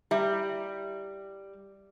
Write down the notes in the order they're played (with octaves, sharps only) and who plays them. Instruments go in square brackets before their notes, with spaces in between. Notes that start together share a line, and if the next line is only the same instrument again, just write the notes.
[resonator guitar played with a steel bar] G3 [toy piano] E4 E5